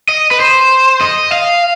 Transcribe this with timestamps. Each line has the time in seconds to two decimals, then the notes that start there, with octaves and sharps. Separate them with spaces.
0.09 D#5
0.31 B4
0.40 C5
1.01 D#5
1.32 F5